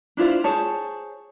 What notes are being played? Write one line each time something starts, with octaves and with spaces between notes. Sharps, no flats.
D4 E4 F4 C5
G#4 C5 C#5 A5